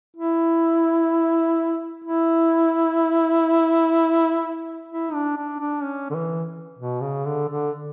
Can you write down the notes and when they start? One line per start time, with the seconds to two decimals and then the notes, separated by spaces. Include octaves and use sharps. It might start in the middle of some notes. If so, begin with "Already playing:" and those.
0.16 E4
2.04 E4
4.88 E4
5.13 D4
5.37 D4
5.59 D4
5.83 C#4
6.10 D3
6.15 E3
6.78 B2
7.01 C#3
7.26 D3
7.49 D3